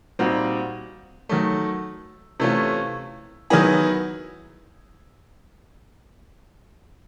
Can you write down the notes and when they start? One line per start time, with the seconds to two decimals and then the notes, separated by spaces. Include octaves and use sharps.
0.19 A#2 G3 C4 D#4 F#4
1.29 D#3 F#3 A3
2.40 C3 E3 A3 C#4 F4
3.50 D#3 F#3 B3 E4 G#4